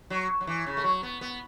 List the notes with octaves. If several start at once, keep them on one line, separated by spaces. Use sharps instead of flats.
F#3
F#3
E3
C#3
A3
F#3
B3
B3